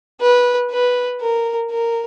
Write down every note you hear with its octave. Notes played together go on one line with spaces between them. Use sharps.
B4
B4
A#4
A#4